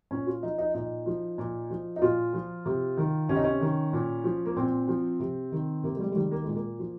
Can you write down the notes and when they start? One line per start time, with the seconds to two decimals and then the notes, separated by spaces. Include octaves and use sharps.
0.11 A#2 C#4
0.27 F4
0.43 F3 D#4
0.58 D#4
0.74 A#2 D#4
1.06 F3
1.38 A#2
1.70 F3
1.96 D#4
2.02 A#2 F4
2.33 F3
2.66 C3
2.97 D#3
3.29 C3 C#4
3.36 D#4
3.44 C#4
3.61 D#3
3.93 A#2
4.24 F3
4.46 A#3
4.56 A#2 C4
4.88 F3
5.20 C3
5.52 D#3
5.83 C3 A#3
5.96 G#3
6.00 G3
6.11 G#3
6.15 D#3 G3
6.31 A#3
6.44 A#2 G#3
6.56 A#3
6.79 F3